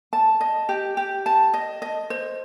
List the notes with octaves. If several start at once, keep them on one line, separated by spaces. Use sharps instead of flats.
A5
D#5
G4
G4
A5
D#5
D#5
C5